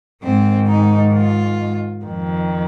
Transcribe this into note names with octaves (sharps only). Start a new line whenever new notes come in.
G#2 D#3 C4
D#4
F4
F2 D#3